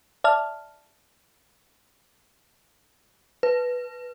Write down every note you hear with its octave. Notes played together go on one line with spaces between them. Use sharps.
D5 E5 A5 F6
B4